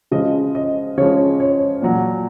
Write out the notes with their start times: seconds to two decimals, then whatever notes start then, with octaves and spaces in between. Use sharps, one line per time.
0.11 C#3 F3 G#3 D#5
0.55 D#5
0.97 C#3 F3 G#3 C#5
1.40 C#5
1.82 A#2 F#3